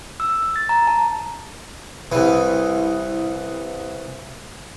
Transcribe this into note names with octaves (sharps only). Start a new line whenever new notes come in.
E6
A6
A#5
A5
C2 E3